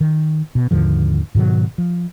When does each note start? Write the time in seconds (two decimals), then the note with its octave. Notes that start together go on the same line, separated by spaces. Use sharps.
0.01 D#3
0.55 B2
0.71 D#2 G#2 D3 F3
1.35 G#2 B2 D#3 F#3
1.78 F3